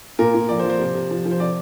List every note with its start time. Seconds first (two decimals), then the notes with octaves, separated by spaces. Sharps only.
0.19 A#2 A#4
0.34 A#2
0.49 F3 D5
0.59 C5
0.64 F3
0.70 C5
0.80 C3
0.95 C3
1.11 F3
1.26 F3
1.31 C5
1.40 C3 D5